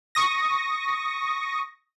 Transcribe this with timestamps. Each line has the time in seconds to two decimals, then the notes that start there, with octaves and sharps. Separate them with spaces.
0.15 C#6 D#6 A#6